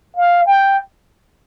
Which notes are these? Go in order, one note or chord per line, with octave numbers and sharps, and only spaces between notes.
F5
G5